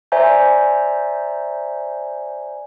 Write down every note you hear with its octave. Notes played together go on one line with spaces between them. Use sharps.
C5 D5 E5 G#5 A#5 G6